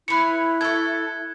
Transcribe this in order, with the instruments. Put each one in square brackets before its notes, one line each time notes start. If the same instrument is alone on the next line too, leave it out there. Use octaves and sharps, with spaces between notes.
[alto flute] E4 [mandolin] B4 C#5 [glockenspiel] F#6 C#7
[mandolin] A4 C#6 [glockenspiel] G#6